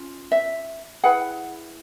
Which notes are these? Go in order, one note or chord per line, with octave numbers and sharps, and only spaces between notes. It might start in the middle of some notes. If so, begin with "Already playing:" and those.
Already playing: C#4 F4
E5
E4 G#4 B4 F#5